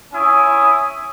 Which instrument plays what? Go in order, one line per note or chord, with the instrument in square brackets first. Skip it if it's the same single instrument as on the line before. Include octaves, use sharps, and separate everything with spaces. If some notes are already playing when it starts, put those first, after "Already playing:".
[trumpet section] C#4 E4 G#5 D#6